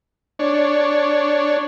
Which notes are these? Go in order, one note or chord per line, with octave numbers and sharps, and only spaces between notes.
D4 C#5